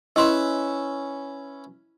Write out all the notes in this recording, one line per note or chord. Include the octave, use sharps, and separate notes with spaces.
C#4 E4 B4 D#5 E5 C6